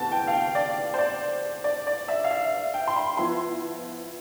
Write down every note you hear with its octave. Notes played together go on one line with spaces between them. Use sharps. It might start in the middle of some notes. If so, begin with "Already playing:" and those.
Already playing: D2 C3 E3 B3 A5
G5
F5
G5
D5
C5
D5
D5
D5
E5
F5
E5
G5
C6
B5
F3 B3 E4 C6